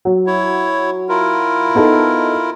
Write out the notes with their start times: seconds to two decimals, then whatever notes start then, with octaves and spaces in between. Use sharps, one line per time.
0.05 F#3
0.27 E4 C#5
1.09 E4 F4 A#4
1.75 B3 D#4 A4